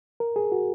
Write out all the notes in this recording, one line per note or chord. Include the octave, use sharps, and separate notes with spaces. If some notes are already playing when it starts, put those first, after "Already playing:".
A#4
G#4
F#4